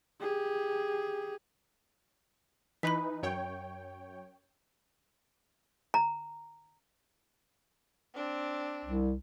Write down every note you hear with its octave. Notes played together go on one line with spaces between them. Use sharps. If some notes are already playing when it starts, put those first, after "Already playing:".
G4 G#4
E3 D#4 B4 B5 B6
F#2 C#5 G5
A#5
C4 D4
C2